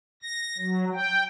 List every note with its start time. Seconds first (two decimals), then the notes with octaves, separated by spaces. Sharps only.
0.22 A#6
0.58 F#3
0.94 G5